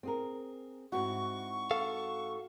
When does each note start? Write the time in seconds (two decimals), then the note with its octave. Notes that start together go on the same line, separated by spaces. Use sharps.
0.03 C4 G#4 A#4
0.92 G#2 C4 E4 F#4 C#6
1.71 A4 F5